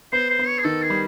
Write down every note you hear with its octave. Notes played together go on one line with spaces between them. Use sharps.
B3 C5
C5
B3
C#5
G#4
D#3 A4
G#4
G3